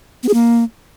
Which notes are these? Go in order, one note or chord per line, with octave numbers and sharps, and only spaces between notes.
B3
G#4
A#3